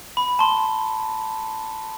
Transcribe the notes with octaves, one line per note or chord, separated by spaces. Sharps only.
B5
A5 C6